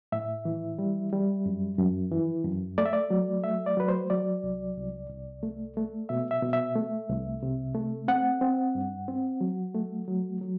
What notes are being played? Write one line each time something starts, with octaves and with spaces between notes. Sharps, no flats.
A2 E5
E3
G3
G3
F#2
F#2
E3
F#2
A3 D5
E5
D5
F#3
A3 E5
D5
F#3 B4
C5
F#3 D5
C2
C2
C2
A3
A3
B2 E5
E5
B2
E5
A3
C2
C3
A3
C4 F#5
C4
G2
C4
F#3
A3
F#3
F#3